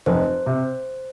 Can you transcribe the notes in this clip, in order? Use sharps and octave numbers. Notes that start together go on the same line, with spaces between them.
F1 C5
C3